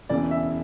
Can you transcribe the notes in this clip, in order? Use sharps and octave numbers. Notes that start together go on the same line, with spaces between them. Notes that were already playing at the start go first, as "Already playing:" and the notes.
E1 E2 C#3 E3 D5
E5